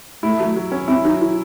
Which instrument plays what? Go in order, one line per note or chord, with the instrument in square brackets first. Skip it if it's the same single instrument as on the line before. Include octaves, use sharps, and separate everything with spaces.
[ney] A3 [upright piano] E4
[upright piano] F#3
F#3
C#4
[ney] C4 [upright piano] E4
[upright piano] F#3 [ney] D#4
[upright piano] F#3 [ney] E4